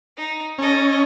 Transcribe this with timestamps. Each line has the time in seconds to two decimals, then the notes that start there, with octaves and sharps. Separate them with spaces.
0.17 D#4
0.58 C#4 A4 D#5